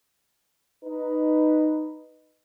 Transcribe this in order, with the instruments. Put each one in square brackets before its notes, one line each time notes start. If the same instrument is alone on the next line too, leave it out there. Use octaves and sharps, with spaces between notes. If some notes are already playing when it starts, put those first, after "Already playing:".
[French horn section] D#4 B4